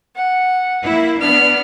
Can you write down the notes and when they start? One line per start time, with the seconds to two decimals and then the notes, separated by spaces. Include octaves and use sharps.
0.14 F#5
0.84 A#3 E4
1.20 B3 D4 F6